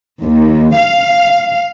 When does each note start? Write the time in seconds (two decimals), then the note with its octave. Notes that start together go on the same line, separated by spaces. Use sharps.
0.24 D#2
0.77 F5